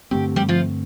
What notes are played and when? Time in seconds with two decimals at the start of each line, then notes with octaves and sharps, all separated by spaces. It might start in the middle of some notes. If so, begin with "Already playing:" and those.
0.11 G2 D3 A3 C4 G4
0.36 G3 G4
0.49 F3 F4